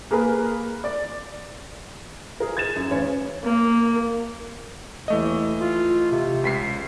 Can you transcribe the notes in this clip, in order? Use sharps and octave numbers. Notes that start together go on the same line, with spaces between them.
A#3 G#4 A#4 B4
D5
G#4 A#4
G#6 A6 E7
F#2
A1 C#4 C#5
A#3
D#2 E3 A3 D#5
F4
C3
C#2 B6 C7